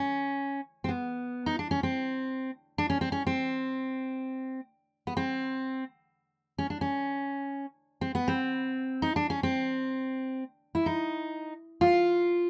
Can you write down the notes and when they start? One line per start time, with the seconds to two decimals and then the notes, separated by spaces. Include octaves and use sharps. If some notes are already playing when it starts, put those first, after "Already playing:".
Already playing: C#4
0.84 C4
0.89 B3
1.46 D#4
1.59 D4
1.71 C#4
1.83 C4
2.78 D4
2.90 C#4
3.01 C4
3.12 C#4
3.27 C4
5.07 B3
5.17 C4
6.58 C#4
6.70 D4
6.81 C#4
8.01 C4
8.15 B3
8.28 C4
9.02 D#4
9.16 D4
9.30 C#4
9.43 C4
10.75 E4
10.86 D#4
11.81 F4